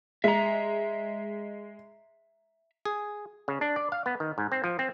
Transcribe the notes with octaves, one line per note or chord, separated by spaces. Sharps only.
G#3 E5 A#5
G#4
C#3
D4
D5
F5
B3
D#3
G#2
C4
F3
C4